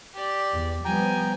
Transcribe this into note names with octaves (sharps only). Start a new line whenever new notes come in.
G4 D5
E2
F3 G3 B3 G5 G#5 A#5